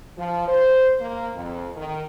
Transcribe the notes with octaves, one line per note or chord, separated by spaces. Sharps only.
F3
C5
A#3
F2
D#3